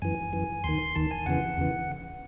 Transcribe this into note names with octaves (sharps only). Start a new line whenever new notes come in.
F#2 E3 G#5
F#2 E3
D#2 D#3 C6
D#2 D#3 A5
G#5
E2 C#3 E3 F#5
E2 C#3 E3